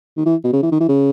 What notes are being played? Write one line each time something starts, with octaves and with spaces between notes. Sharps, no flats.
D#3
E3
B2
C#3
E3
D#3
E3
C#3